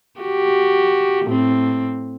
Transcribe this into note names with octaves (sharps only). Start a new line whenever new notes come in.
F#4 G4
A2 C4